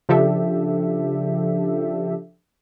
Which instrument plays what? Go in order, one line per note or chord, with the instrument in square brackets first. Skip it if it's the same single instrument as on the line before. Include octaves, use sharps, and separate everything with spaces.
[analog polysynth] C#3 F3 D4 G4 A4 E5